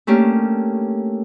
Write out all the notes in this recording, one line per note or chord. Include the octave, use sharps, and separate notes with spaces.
A3 A#3 C#4 D4 G4